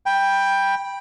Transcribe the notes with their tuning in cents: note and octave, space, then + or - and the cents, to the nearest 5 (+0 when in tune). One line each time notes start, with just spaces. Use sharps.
G5 +10 B5 -15